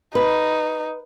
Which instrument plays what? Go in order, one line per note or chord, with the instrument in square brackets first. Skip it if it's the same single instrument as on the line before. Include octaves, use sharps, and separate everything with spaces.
[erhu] D#4 [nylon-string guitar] B4